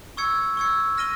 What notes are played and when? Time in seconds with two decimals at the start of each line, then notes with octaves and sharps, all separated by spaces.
0.17 C#6 E6 G#6 C#7
0.57 C#6 E6 G#6 C#7
0.98 F6 A#6 D#7 G7